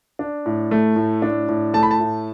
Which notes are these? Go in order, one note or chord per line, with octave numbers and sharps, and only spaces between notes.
D4
A2
A3
A2
D4
A2
A3 A5
B5
A5
A2